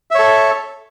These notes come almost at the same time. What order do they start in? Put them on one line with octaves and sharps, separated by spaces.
E5 C#5 A4